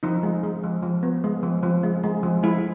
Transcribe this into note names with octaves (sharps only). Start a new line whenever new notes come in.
F3 D#4
G#3
G#3
F3
F3
B3
G#3
F3
F3
G#3
G#3
F3
G#3 E4